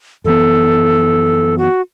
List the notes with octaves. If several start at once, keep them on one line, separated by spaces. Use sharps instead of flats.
F#2 E3 B3 A4
F#4